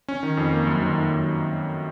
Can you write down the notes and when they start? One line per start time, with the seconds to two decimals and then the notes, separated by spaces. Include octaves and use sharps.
0.08 C#4
0.23 D#3
0.37 F2
0.53 A#3
0.67 F#2
0.82 D#3
0.96 A#3
1.11 F#2